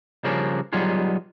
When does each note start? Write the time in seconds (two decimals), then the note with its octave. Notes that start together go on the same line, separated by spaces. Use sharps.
0.24 C#3 F3 G3 A#3 C#4 D4
0.73 F#3 G3 B3 D#4 F4 G#4